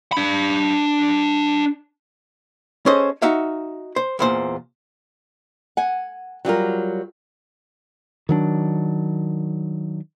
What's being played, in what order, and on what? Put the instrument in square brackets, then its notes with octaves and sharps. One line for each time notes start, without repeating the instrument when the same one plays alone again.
[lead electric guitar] D4 B5
[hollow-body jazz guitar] C#4 G#4 A4 C5 D#5
D#4 F#4 E5 F5
C5
E2 A#2 C5
[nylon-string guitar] F#5 G#5
F#3 G3 F4 A#4
[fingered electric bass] D#3 F#3 D4